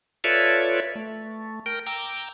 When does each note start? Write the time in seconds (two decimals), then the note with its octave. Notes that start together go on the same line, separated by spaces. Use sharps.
0.24 F4 A4 B4 C#5 D5 E5
0.95 A3
1.66 A#4 G5
1.86 G5 A#5 D6 E6